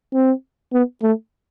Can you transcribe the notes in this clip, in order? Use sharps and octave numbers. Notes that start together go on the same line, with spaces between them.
C4
B3
A3